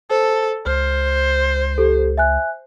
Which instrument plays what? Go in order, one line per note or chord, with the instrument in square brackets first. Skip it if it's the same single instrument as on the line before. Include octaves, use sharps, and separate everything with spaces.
[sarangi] A4 [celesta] C5
[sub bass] C#2 [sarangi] C5 [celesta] F6
[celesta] G4 A4
E5 G#5 F#6